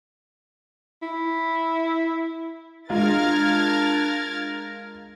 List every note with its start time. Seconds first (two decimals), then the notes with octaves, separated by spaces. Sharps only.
1.02 E4
2.90 G#3 D4 F4 A#4 F6 G#6 A6